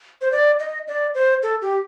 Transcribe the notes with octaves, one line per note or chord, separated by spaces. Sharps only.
C5
D5
D#5
D5
C5
A4
G4